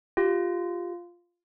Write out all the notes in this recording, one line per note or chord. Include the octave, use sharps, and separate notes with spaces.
F4 G4